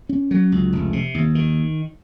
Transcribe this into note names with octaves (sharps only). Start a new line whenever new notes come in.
C#4
F#3
C#2
F1
C3
D#2
D#3